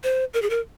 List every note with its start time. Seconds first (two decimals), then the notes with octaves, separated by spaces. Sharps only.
0.03 C5
0.34 A#4
0.42 G#4
0.50 A#4